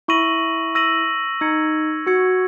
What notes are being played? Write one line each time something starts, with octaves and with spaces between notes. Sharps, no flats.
E4 C#6 E6 A#6 D#7 F#7
C#6 E6 A#6 D#7 F#7
D#4 E6 G#6 C#7
F#4 E6 G#6 C#7